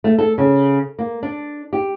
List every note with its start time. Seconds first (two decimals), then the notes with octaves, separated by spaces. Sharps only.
0.04 A3
0.19 A4
0.38 C#3
0.99 A#3
1.23 D4
1.73 G4